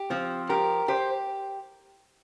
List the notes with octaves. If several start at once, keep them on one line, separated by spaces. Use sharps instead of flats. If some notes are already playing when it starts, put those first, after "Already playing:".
Already playing: G4
F3 C4
G4 A#4
G4 C5